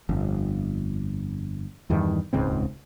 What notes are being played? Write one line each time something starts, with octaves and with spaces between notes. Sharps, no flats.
G1 F2
E2 G2 D#3
D#1 C#2 G#2 C4